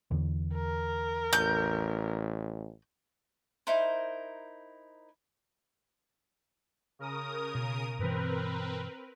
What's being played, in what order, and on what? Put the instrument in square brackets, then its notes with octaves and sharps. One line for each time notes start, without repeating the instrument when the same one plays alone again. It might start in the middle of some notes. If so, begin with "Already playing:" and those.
[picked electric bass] E2 D3 E3
[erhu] A#4
[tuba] A1 [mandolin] G6
[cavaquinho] D#4 E4 A#4 C5
[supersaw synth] C#3 A#4 D#6
[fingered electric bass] B2
[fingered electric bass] G2 B2 E3 [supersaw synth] C4 A#4 B4